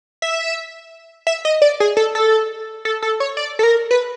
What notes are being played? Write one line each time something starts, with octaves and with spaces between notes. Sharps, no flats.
E5
E5
D#5
D5
G#4
A4
A4
A4
A4
C#5
D5
A4
A#4
B4